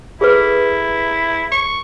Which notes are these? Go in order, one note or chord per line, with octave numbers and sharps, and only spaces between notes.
E4 G#4 A4 B4
C#6